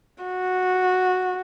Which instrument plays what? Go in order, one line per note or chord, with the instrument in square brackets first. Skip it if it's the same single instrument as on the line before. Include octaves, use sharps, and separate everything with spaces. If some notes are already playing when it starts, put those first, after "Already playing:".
[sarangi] F#4